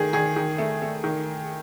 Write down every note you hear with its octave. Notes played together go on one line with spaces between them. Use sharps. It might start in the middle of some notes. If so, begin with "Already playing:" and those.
Already playing: D#3 A3 G#4
D#3 G#4
D#3
A3
A3
D#3